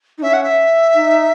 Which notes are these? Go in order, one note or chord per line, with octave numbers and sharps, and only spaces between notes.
D#4
C#4 E5
F#5
E5
D#4